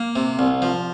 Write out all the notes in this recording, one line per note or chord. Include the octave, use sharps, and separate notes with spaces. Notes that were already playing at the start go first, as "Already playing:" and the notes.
Already playing: A#3
C3
C2
F3